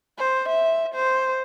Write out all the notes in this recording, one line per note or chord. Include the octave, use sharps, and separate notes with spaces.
C5
E5
C5